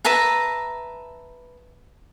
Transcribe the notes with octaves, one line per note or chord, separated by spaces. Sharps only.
B4 E5 A5 A#5